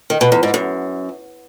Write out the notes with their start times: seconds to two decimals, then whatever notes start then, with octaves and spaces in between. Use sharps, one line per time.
0.10 D#3
0.21 B2
0.32 E2
0.43 G#2
0.54 F#2